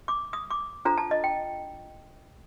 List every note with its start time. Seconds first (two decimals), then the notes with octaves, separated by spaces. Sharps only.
0.08 D6
0.33 D#6
0.50 D6
0.85 D4 F4 A4 C5 A#5
0.98 A5
1.11 D#5
1.24 G5